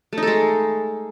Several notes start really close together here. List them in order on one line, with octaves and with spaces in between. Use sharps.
A3 D#4 A4 G#3